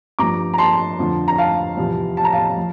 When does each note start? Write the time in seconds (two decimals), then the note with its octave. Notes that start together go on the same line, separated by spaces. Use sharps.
0.19 G2 F3 A#5 D6
0.54 A#5
0.58 A5 C6
0.99 F2 D3 F3
1.28 A#5
1.38 F5 A5
1.77 E2 C3 F3
2.17 A5
2.24 A#5
2.33 F5 A5
2.57 F3